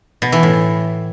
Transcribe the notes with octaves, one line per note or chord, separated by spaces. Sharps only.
B2
E3
A2